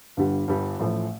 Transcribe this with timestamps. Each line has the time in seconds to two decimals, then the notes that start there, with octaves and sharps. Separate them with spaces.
0.17 G1 G2 D3 G3
0.48 G1 G2 D3 G3
0.79 A1 A2 F3 A3